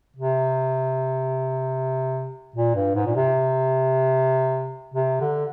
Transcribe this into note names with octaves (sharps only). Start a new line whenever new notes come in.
C3
A#2
G2
G#2
A#2
C3
C3
D3